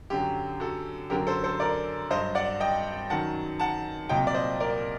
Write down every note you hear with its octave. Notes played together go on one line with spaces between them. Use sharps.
F#2 D3 F#3 G4
F#4 A4
F#2 D3 F#3 G4 A#4
A4 C5
A4 C5
A#4 D5
G2 F#3 C5 D#5
D5 F#5
D#5 G5
F#2 D#3 F#3 F#5 A5
F#5 A5
C2 A#2 F#3 D#5 G5
D5
C5 D#5
A#4 D5